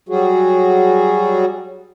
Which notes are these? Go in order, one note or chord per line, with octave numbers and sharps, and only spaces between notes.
F#3 G3 F#4 G#4